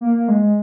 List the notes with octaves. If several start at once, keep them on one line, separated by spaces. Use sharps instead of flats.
A#3
A#3
G#3
G#3